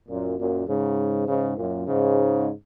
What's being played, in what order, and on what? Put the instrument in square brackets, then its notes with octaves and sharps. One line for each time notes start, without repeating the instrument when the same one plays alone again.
[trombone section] F#2 A#2
F#2 A#2
G#2 C#3
G#2 C#3
F#2 A#2
G#2 C#3